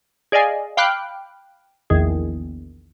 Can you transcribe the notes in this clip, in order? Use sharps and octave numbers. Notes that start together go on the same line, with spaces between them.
G#4 D5 D#5 F5 G#5
F5 G5 B5 D6 F6 F#6
A#1 E2 D#3 G#4